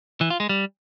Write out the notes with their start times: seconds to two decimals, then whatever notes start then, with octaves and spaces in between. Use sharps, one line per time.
0.21 E3
0.30 F4
0.40 G#3
0.49 G3